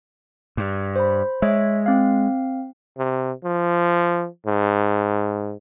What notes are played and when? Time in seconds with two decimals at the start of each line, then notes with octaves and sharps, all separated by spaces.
0.57 G2
0.96 C5 B5
1.42 G#3 C#5 E5
1.86 C4 F5
2.98 C3
3.44 F3
4.46 G#2